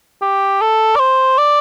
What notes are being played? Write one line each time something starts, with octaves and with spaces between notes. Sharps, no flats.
G4
A4
D5
C5
D5